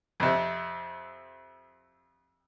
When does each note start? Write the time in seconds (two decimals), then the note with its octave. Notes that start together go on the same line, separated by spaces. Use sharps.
0.20 F2 C3